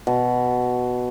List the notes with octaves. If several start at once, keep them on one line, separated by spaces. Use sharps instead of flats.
B2